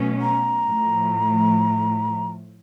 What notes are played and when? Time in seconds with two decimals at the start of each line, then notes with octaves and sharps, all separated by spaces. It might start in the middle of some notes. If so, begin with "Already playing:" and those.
Already playing: B2 F#3 A3 C#4
0.21 A#5
0.67 A2 F3 A3